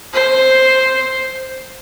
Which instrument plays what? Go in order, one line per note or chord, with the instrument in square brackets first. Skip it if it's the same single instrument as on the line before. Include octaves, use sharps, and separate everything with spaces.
[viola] C5